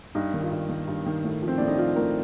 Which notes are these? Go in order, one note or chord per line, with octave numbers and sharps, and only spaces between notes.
G2 D#4
D#3
F4
G2
D#3
G2
D#3
A2
F3
C4
A2 D4
D#4
F3 F4
A2 A#4